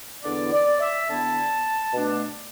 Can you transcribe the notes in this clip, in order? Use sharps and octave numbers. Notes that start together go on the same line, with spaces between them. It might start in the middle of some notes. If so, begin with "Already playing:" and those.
E2 D3 B3 E4 D5
D5
E5
D3 B3 E4 A5
B2 A3 D4